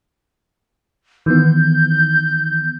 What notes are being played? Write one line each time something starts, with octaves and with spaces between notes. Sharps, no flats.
D#3 E3 B3 G6